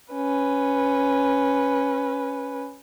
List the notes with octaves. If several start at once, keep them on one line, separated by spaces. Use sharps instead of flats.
C#4 B4